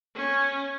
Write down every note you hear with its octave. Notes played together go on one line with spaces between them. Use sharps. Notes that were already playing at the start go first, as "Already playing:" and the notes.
C#4